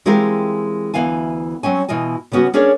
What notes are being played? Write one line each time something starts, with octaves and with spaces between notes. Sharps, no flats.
E3 G#3 C4 F4 G4 A#4
D2 G#2 E3 B3 F5 G#5
F#3 C4 C#4 G#5
B2 E3 F4 D#5 G#5
C#3 G3 B3 C#4 F#4
C#4 D4 G#4 A#4 C#5